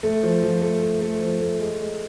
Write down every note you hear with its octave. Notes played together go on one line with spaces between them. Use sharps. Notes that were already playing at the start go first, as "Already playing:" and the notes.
A3
F3
F3
A3
A3
A3
F3
A3
G#3
G#3